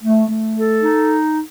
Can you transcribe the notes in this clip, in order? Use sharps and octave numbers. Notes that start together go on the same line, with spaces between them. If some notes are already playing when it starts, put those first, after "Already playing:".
A3
A3
A4
D#4